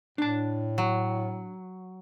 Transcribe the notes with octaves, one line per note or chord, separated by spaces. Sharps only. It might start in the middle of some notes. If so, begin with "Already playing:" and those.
A2 D4 A5
F#3